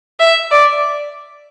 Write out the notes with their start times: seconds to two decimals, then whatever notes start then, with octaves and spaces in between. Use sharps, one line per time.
0.20 E5
0.51 D5